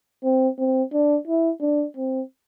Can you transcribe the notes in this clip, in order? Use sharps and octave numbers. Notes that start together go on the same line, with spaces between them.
C4
C4
D4
E4
D4
C4